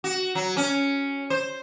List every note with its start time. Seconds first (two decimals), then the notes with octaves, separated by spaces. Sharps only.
0.04 F#4
0.35 F#3
0.57 C#4
1.30 C5